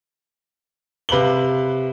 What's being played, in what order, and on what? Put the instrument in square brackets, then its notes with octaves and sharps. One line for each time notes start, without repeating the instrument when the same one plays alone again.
[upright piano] C3 B4 F5 F#7 G7